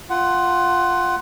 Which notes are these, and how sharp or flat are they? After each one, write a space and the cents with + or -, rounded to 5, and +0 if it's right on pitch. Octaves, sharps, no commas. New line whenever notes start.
F4 +0 F#5 +15